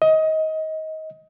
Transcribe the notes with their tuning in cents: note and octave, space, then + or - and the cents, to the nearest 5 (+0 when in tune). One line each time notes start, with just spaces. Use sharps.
D#5 +20